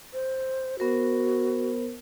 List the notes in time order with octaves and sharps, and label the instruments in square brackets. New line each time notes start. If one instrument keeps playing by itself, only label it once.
[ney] C5
[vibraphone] B3 A#4 C5 [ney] F#4